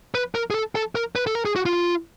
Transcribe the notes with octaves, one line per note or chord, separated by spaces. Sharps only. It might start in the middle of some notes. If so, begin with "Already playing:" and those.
B4
A#4
G#4
A4
A4
A#4
B4
A4
A#4
G#4
F#4
F4